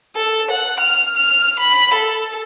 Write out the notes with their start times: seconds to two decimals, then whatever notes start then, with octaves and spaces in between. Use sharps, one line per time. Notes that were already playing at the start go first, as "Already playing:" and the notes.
0.15 A4
0.51 F#5
0.80 F6
1.16 F6
1.59 B5
1.94 A4